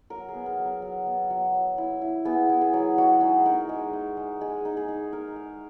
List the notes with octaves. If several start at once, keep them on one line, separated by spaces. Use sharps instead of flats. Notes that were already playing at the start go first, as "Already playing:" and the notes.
F#3 A#4
G#4
B3
A#4
F#3
A#4
F#3
B3
F#3
F#3
E4
E4
B3 G#4
E4
G#4
F#3
G#3 F#4
D#4 G#4
D#4 A#4
G#3
D#4
G#3
G#3 G#4
D#4
G#4
D#4
D#4 A#4
G#3